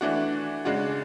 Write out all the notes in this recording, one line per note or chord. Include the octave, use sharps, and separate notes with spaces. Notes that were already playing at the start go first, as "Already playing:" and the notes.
E3 A3 D4 F#4
C#3 G#3 D4 F#4